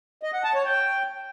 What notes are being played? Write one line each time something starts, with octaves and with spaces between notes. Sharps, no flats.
D#5
F#5
A5
C#5
G5